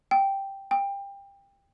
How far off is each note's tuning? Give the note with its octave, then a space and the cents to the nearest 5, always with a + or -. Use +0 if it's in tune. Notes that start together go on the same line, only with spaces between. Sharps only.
G5 +0
G5 +25